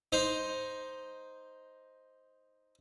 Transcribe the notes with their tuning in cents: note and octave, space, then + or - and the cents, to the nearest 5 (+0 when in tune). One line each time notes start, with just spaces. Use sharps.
D#4 +5 C5 +0